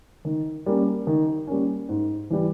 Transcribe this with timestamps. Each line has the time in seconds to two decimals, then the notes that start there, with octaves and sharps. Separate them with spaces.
0.25 D#3
0.66 G3 A#3 C#4
1.07 D#3
1.47 G3 A#3 C#4
1.89 G#2
2.30 E3 G3